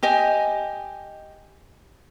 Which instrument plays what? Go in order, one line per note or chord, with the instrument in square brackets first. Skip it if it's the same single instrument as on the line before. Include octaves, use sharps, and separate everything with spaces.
[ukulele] G4 D#5 G#5